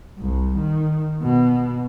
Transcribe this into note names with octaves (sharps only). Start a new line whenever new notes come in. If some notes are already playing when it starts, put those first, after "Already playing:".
C2
D#3
B2